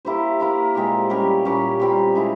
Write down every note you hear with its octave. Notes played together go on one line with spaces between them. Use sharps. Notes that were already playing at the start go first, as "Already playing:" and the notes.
A#3 E4 G4 C5
A#3 E4 A#4
A#2 G#3 C4 G4
G3 C#4 G4 A#4
A#2 G3 C#4 G4
A#2 G3 C4 G4
G#3 E4 A#4